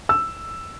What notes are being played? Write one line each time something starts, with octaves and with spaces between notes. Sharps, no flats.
E6